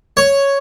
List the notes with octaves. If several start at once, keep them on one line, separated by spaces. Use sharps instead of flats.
C#5